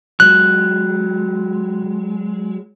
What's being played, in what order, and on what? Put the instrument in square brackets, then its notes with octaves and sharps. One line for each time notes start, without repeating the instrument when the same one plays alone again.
[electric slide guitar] F#3 G#3 [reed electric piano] F#6